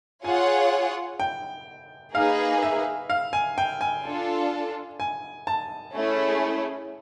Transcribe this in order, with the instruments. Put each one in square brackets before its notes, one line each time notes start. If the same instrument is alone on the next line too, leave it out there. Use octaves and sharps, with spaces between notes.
[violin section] F4 G#4 C#5 F#5 [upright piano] G#5
[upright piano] G5
[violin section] A#3 D#4 G#4 B4 [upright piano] F5
[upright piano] E5
F5
G#5
G5
G#5
[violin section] D4 F4 A4
[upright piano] G#5
A5
[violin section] A3 C#4 E4 G#4